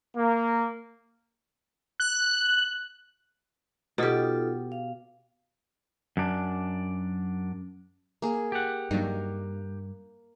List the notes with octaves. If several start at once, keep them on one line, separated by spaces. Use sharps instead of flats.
A#3
F#6
B2 D#4 F4 G4 A4
F5
F#2 D4
A#3 G#4
G4 F#5
G2 F#3 A#3 D4 D#4